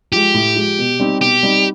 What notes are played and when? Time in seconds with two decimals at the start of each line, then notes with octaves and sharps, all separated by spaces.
0.12 F3 G#3 G4
0.34 A2
0.56 F3 G#3
0.78 B2
1.00 G3 C4 D#4
1.21 B2 G4
1.43 G3 C4 D#4